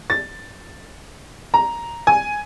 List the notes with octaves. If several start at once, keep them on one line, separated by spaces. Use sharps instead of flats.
A6
A#5
G#5